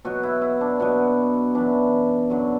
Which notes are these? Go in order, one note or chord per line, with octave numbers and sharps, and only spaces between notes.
B2 F#3 F#4
E4
E4
D4
B2 F#3 B3
F#2 E3 D4
F#2 D3 F#3